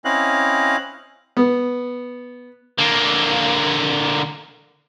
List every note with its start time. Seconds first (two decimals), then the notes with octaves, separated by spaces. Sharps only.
0.05 C4 C#4 E4 D#5 F5 F#6
1.37 B3
2.79 D3 A#3